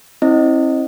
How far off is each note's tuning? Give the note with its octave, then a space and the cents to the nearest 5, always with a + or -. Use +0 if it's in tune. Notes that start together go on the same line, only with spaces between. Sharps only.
C4 +35 E4 -25 D#5 -5